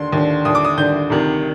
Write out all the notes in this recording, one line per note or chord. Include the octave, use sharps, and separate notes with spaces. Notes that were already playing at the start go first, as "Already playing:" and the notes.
Already playing: D#2 D3 C6
D#2 D3
D#2 D3 D#6
D6
D#6
D#2 D3 G6
D2 C3 D#3